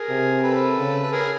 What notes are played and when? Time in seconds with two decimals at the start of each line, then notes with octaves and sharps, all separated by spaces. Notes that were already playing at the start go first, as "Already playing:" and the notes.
Already playing: G#4 A#4
0.09 C3
0.43 A4 B4
0.78 C#3
1.03 B4
1.12 G#4 A#4